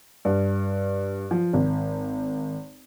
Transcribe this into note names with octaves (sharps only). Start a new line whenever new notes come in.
G2
F3
G#1